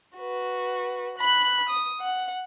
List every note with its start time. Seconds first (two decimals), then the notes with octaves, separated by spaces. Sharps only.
0.18 F#4 B4
1.18 B5 F#6
1.69 D#6
2.01 F#5